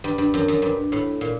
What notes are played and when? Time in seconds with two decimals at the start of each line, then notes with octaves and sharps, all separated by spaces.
0.04 G2
0.18 G2
0.34 F#2
0.48 F#2
0.62 G2
0.92 A2
1.21 A#2